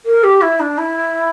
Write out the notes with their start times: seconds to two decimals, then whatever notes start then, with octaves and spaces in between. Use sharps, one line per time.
0.05 A#4
0.23 G4
0.41 E4
0.60 D4
0.78 E4